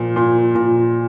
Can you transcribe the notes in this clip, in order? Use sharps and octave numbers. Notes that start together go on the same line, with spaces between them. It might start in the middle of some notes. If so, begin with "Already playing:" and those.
Already playing: A#2 F3
A#2
A#2